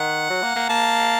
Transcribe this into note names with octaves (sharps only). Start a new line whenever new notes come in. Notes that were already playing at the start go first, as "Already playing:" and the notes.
Already playing: D#3 F#5
F#3
A#3
A#3
A#3 A5